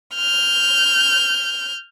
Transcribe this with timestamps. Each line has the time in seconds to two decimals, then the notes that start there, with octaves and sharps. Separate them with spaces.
0.15 F6 G6